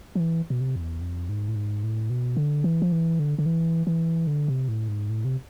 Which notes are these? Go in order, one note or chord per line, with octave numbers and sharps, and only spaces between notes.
F3
E3
B2
C3
F2
E2
F2
G#2
A2
G#2
A2
B2
D3
E3
F3
E3
D3
D3
E3
E3
D3
C3
A2
G#2
A2
C3